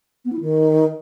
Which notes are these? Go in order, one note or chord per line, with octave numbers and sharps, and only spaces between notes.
B3
E4
D#3